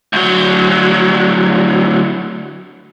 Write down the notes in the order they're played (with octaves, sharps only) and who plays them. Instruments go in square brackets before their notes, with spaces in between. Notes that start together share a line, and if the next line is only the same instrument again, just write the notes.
[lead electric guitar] D2 F#3